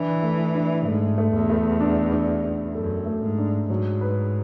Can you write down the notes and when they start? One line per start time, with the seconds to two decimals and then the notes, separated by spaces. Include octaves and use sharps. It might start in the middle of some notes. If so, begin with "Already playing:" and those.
Already playing: E3 D4
0.22 A3
0.55 D4
0.85 G#2 A3
1.18 A3
1.34 E2
1.50 A3
1.80 D4
2.12 D4
2.44 D4
2.75 F#2 A4
3.06 A3
3.22 G#2
3.38 D4
3.70 G#2 F#3
4.01 B4